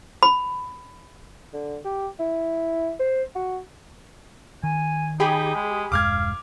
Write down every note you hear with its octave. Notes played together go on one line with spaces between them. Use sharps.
B5
D3
G4
E4
C5
F#4
D#3 G#5
D#4 G4 G#4 G5 B5
G#3
E1 G2 G#3 F5 D6 F6 G#6